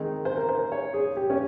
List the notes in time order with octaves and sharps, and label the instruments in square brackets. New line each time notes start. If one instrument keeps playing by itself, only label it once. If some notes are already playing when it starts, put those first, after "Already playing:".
Already playing: [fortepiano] D#3 G#3 C4 D#4
C5
A#4
C5
C#5
G#4
G4
C#4